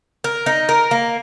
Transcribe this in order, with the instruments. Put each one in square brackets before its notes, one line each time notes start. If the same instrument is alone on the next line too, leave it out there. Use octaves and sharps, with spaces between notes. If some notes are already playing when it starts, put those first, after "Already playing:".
[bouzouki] A#4
D#4
A#4
A#3